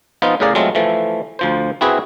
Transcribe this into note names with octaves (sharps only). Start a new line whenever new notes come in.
F3 B3 D#4 F4
A2 C#3 G#4 A#4 D5 F5
F#3 G#3 A3 C4 F4
E3 F3 A3
D2 F3 C5
C4 E4 F#4 G#4 B4